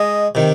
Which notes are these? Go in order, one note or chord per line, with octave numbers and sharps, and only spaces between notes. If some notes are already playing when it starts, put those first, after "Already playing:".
Already playing: G#3 D#5
C3 D#3